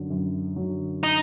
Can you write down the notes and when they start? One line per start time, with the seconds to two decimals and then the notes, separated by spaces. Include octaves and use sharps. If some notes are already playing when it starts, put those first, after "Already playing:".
Already playing: F#2 D3 F#3
0.10 F#2
0.56 D3 F#3
1.03 D#4